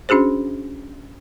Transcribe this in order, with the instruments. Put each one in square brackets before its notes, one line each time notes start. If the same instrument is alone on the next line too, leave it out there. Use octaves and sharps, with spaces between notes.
[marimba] C#4 D4 F#4 G#4 C5